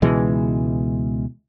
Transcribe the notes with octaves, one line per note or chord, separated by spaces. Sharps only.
C#2 B2 E3 G#3